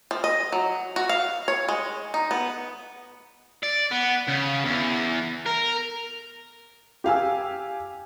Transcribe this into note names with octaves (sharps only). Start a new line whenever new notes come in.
F3
D#5
F#3
F#4
F5
C#5
G#3
D#4
B3
D5
B3
C#3
E2
A#4
G4 F5 G#5 E6